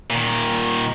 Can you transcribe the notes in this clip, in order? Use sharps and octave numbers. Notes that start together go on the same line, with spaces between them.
A#2 D#3